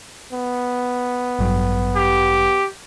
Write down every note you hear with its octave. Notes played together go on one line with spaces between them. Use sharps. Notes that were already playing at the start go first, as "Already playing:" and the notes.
B3
A1 G2 F#3
G4